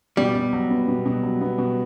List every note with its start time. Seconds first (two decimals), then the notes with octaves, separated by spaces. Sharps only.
0.17 B2 G3
0.35 B2
0.53 F#3
0.70 B3
0.88 B2
1.06 B2
1.23 F#3
1.41 B3
1.58 B2